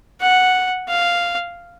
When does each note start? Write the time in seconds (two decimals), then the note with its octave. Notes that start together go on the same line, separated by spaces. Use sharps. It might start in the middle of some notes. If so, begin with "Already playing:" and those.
0.21 F#5
0.88 F5